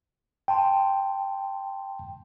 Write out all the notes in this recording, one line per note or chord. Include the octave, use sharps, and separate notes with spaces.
G5 A5 C6